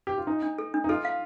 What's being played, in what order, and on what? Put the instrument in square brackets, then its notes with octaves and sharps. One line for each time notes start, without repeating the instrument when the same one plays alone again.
[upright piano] G4
F4
[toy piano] D4 [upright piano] D#4
[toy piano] D4
A4
D4
[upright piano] D#4
[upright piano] F4 [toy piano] A4
[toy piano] F5